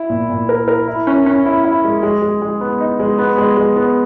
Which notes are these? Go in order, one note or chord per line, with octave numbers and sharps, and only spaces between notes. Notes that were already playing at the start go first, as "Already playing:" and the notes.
Already playing: E4
A#2
A#2
A#4
A#4
E4
C#4
C#4
E4
E4
G#3
G#3
G#3
G#3
B3
D#4
G#3
B3
G#3
G#3
B3